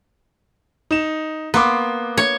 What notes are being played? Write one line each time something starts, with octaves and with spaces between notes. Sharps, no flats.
D#4 E7
A#3 B3 C6 D6
C#5